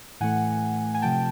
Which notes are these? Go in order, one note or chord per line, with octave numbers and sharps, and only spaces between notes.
A2 E3 A3 F#5 G#5
G#5
C3 F3 A3 G5 A5